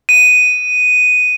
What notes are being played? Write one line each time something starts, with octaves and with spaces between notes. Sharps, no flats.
D#7